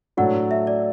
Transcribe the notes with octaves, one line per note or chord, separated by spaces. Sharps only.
A2 F#3 A3 D4 A4 F#5
E5
D5